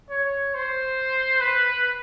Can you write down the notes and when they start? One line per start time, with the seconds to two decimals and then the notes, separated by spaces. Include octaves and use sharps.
0.10 C#5
0.55 C5
1.41 B4